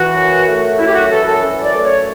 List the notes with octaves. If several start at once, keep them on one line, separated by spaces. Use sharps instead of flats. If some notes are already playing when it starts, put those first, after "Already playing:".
Already playing: E3 F#4
F#2
A3
F#2 E4
G4
F#4
E3 A4
A4
F#2
D5
A3
C#5